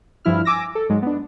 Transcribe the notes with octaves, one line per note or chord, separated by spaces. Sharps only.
G2 F3 E4 F6
G#5 D6 E6 A#6
A4
G#2 F#3 G#3
B3 D4